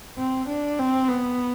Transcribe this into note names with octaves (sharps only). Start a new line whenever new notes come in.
C4
D4
C4
B3